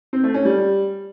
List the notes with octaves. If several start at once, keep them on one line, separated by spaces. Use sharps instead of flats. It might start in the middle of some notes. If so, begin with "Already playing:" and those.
C4
A3
C#4
G3